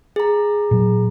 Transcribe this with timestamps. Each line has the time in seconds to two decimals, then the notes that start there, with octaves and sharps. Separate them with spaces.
0.16 G#4 A#5
0.71 A#2 F#3